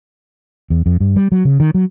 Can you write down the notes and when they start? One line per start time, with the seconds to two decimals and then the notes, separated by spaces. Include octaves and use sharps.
0.70 E2
0.86 F2
1.00 G2
1.16 G3
1.32 F#3
1.45 C#3
1.60 D#3
1.74 F#3